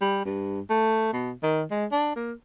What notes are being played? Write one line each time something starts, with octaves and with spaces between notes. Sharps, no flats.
G3
G2
A3
B2
D#3
G#3
D4
A#3